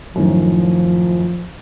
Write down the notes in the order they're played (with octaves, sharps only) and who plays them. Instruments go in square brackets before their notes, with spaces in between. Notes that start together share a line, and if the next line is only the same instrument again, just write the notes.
[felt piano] F#2 A2 D#3 [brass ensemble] F3